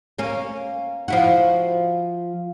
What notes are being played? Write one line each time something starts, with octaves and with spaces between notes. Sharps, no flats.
A#3 C#4
F3 E4 F#4